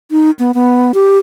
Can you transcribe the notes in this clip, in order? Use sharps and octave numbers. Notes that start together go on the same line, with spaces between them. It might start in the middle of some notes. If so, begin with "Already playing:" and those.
D#4
B3
B3
G4